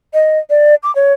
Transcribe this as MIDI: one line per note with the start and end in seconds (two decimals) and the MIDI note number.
0.14 0.39 75
0.50 0.75 74
0.83 0.94 86
0.95 1.13 73